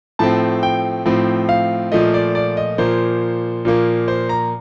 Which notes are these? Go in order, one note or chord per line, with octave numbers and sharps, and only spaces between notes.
A2 F3 A3 C4 A5
G5
A2 F3 C4
F5
A#2 F3 A3 D#5
D5
D5
D#5
A#2 F3 A#3 C5
A#2 F3 A#3
C5
A#5